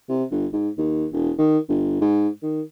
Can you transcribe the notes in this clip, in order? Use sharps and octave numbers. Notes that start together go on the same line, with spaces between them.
C3
G1
G#2
D#2
E1
D#3
G1
G#2
D#3